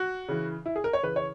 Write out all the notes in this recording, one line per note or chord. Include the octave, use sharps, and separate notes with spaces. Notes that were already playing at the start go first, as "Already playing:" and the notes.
Already playing: F#4
C#3 E3
E4
G#4
A#4
C#5
C#3 E3 B4
C#5